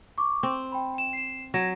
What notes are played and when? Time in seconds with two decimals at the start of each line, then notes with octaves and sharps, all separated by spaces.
0.18 C#6 D6
0.43 C4
0.72 G5 B5
0.94 G5 E7
1.13 C7 E7
1.54 F#3 G#6 A#6 E7